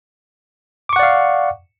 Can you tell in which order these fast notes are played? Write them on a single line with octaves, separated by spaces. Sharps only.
D6 C#6 F#5 D5 F5